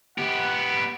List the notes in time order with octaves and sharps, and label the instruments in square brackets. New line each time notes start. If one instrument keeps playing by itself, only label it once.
[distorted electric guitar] B3 G4 [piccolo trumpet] F#5